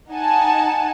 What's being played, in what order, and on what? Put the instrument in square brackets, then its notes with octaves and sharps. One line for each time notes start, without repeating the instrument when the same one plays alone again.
[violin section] D#4 F#5 G#5 A5